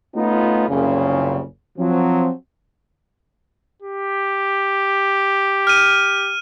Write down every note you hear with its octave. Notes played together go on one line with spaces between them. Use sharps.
A3 B3 C#4 D#4 F4
F#1 C2 A#2 C#3
F3 F#3 C4
G4
F6 D#7